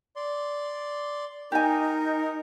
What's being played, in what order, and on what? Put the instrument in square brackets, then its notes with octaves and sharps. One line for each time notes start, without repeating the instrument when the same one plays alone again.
[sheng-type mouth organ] D5 C6
[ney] D#4 [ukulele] G4 G#5 [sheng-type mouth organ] A#4